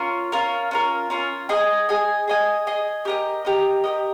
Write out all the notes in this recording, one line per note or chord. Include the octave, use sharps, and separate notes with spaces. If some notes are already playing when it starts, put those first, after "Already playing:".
Already playing: C#4 F4 A#4
C#4 F4 A#4
C#4 F4 A#4
C#4 F4 A#4
G#4 D#5 G#5
G#4 D#5 G#5
G#4 D#5 G#5
G#4 D#5 G#5
G4 A#4 D#5
G4 A#4 D#5
G4 A#4 D#5